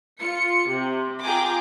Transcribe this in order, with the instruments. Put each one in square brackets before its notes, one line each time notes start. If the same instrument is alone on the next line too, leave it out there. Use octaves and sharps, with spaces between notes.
[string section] F4 C#7
C3
F4 G#4 G5 G#5 A#5 D6